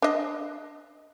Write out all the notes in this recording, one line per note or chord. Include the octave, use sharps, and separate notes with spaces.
D4 D#5